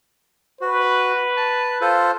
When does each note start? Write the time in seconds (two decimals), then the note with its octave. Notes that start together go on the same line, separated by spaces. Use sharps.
0.61 F#4 B4
1.37 A5
1.81 F4 A4 C5